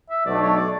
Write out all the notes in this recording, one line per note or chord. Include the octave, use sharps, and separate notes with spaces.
E5
B1 B2 F#3 A3 D4 D5
C#5
D5